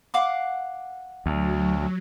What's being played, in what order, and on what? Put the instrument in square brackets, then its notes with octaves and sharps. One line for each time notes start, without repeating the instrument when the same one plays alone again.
[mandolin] F5 F#5 D6
[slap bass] D2 [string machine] F#3